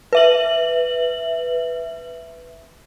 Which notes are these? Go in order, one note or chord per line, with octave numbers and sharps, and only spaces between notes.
B4 E5 F#7